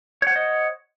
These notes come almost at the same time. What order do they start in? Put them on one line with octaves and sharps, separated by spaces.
C#5 F#5 C5 D#5